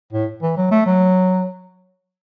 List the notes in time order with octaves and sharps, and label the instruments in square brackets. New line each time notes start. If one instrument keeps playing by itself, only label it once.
[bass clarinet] A2
E3
F#3
A3
F#3